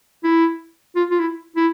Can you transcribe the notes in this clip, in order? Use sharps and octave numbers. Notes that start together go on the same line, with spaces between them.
E4
F4
F4
E4
E4